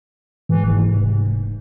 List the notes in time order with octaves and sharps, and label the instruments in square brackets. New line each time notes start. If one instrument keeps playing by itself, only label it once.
[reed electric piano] G#2 [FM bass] E3
[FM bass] F#1
F1